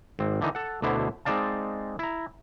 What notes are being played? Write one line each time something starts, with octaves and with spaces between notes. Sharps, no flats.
G#1 C4
D3 E3 D#4
A4 F#5
D2 B2 D3 E4 C5
G#3 C4 D#4 D5 F5 A5
E4 A#5